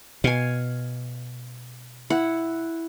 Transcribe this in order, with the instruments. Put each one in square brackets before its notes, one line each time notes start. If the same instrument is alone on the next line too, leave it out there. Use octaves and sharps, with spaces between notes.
[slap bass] B2 [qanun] F5 G#5
[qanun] E4 F#5